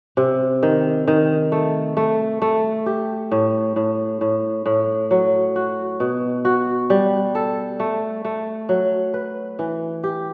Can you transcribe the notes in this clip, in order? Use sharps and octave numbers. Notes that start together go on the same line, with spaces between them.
C3
D#3
D#3
A3
A3
A3
G4
A2
A2
A2
A2
F#3
F#4
B2
F#4
G3
A4
A3
A3
F#3
B4
E3
G4